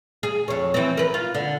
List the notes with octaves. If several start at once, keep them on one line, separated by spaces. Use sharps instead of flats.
G#4
F2 C#5
E3 C4
A#4 B4
F4
D3